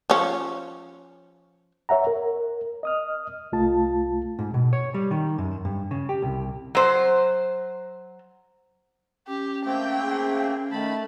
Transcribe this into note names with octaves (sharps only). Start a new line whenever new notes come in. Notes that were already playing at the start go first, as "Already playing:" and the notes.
F3 C#4
C#5 E5 F#5 A#5
A#4
D#5 D#6 F6
C2 A3 F4 A5
G#2
B2
C#5
G3
D#3
F#2
G2
C#3
G4
C2
F#3 C5
C#4 G4
A3 A#3 C4 G5
G#4
D#3 A3 A5 B5